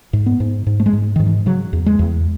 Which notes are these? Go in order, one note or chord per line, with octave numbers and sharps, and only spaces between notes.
G#2
B3
G#2
G#2
A3
G#3
G#2
G#2 D#3
E3
C#3 F#3
E2
G#3
E2